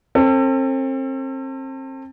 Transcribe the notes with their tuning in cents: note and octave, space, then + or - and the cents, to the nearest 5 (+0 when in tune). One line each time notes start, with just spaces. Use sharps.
C4 +35 A4 +30